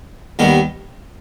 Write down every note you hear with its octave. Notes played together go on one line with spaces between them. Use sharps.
D#2 D#3 G3 B3